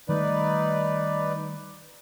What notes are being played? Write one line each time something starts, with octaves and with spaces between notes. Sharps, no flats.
D#3 G3 A3 D#4 B4 D5